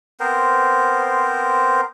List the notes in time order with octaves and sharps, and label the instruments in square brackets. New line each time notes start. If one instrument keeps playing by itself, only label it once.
[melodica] B3 C4 A#4 C5